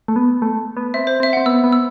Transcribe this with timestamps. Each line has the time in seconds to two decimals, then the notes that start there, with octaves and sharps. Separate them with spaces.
0.08 A3
0.16 B3
0.42 A3
0.77 B3
0.94 C4 E5
1.07 C5
1.20 C4 E5
1.33 C4 F#5
1.46 B3 E6
1.64 B3
1.72 E6